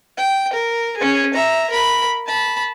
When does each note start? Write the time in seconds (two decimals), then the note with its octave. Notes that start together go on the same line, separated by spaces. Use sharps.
0.18 G5
0.53 A#4
0.97 C#4 G#4
1.34 E5 A#5
1.71 A#4 B5
2.27 A5 B5